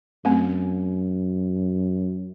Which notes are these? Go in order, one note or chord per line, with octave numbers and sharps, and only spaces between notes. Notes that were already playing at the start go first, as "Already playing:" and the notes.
F#2 A3 C4